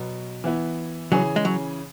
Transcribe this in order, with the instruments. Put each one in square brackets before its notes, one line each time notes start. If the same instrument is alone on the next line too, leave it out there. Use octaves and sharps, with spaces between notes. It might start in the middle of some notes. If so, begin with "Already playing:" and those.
Already playing: [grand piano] B2 F#3 B3
E3 B3 E4
[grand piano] C#3 E3 C#4 G#4 [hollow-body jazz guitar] F#3
[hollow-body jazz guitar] G#3
F#3